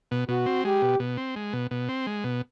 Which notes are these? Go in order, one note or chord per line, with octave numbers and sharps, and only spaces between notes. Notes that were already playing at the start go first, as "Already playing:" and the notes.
B2
B2 F#4
C4
G#3 G4
B2
B2
C4
G#3
B2
B2
C4
G#3
B2